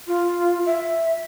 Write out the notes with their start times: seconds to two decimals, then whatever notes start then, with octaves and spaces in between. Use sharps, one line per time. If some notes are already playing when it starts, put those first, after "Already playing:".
0.07 F4
0.66 E5